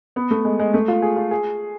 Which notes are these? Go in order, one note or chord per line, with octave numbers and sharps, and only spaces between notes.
B3
A3
G#3
G#3
A3
F4
G#4
F4
G#4